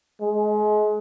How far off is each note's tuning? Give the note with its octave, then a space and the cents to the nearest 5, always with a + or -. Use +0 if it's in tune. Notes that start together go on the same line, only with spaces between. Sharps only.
G#3 +30